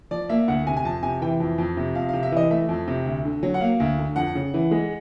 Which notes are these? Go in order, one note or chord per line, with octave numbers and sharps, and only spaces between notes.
F3 D5
A#3 E5
D2 F#5
C3 G#5
G#5
F2 A5
C3 G#5
E3 G5
F2
F2
C3
F2 F5
C3 F5
E5
E3 D#5
A3 E5
F2
C3
D2
D3
F#3
F#5
A#3 F5
D2
D3
F2 F#5
C#3
E3
G#3